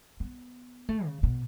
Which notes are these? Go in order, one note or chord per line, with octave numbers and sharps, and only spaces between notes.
B3
A3
C#3
B2